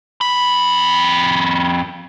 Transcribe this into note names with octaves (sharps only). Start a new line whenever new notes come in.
F2 B5